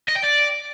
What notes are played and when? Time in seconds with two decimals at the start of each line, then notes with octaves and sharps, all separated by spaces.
0.08 D#5
0.15 G5
0.23 D5